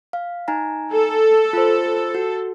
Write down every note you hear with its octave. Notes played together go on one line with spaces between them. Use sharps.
F5
D#4 G#5 A#5
A4
F4 C5
F#4